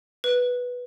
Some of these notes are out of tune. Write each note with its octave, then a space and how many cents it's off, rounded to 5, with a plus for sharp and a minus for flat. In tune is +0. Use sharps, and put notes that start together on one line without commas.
B4 -5